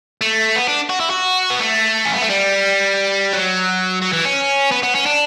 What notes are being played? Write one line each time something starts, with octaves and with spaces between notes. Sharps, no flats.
A3
B3
D4
F#4
E4
F#4
B3
A3
C#4
B3
A3
G3
F#3
F#3
E3
C#4
B3
B3
C#4
D4